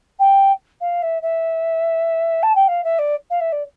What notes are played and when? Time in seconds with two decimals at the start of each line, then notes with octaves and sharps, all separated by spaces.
0.19 G5
0.80 F5
1.02 E5
1.22 E5
2.42 A5
2.55 G5
2.68 F5
2.83 E5
2.98 D5
3.30 F5
3.40 E5
3.52 D5